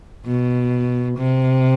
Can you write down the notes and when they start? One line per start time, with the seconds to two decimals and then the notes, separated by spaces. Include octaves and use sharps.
0.26 B2
1.17 C3